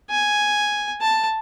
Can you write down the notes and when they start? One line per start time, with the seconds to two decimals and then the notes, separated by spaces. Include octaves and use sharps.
0.10 G#5
1.02 A5